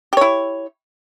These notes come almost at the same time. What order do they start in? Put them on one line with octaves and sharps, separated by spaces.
G4 C#5 E4